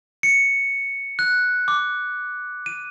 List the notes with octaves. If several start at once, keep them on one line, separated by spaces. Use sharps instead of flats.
C#7
F#6
D6
D#7